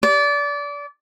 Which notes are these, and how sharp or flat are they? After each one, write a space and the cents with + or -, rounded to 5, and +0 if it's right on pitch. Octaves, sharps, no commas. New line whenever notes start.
D5 -25